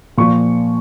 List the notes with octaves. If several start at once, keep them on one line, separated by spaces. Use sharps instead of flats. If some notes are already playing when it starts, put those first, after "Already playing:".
A#2 F3 C#6